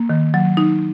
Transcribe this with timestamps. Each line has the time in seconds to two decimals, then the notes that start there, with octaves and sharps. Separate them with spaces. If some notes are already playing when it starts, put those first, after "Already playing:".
Already playing: A#3
0.09 D#3
0.34 F#3
0.57 D#4